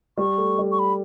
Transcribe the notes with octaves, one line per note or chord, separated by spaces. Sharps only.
G3 C#6
A3
G3
C#6
B5